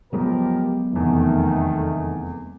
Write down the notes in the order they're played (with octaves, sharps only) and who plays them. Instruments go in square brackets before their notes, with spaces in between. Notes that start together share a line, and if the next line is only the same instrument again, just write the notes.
[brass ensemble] F3 G4 A#4 [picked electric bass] F#3 G#3 B3
[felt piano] F1 E2 [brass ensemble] D#3 A3